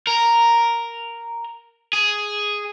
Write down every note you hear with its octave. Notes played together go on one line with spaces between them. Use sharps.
A#4
G#4